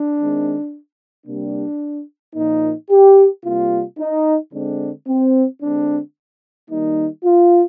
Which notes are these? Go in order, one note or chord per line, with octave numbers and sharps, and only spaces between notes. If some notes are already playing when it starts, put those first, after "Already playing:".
Already playing: D4
D#3 G#3 C4
C3 G3 A#3 D4
A#2 F3 A#3 D#4
G4
C3 G3 A#3 F4
D#4
D3 G#3 C4 D4
C4
D3 G#3 C4 D4
D#3 G3 A#3 D#4
F4